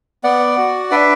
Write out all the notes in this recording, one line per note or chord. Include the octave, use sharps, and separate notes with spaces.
B3 D5 F#5
F#4
D4 B4 E5